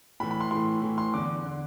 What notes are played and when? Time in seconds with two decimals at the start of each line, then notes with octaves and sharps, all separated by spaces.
0.20 A2 B5
0.23 E3
0.31 B5
0.41 C6
0.51 A2 E3 C6
0.82 A2 E3
0.98 C6
1.14 E2 D3 D6
1.45 D3